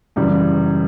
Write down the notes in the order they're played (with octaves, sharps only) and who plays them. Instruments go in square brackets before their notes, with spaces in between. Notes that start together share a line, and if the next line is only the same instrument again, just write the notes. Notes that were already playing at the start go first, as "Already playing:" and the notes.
[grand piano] F#2 C#3 E3 G3